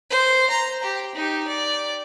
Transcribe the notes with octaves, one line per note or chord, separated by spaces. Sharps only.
C5
A#5
G4
D#4 G4
D5